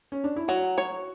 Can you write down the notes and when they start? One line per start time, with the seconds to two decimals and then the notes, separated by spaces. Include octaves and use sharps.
0.12 C#4
0.24 D4
0.36 E4
0.48 F#3 F#4
0.78 C#5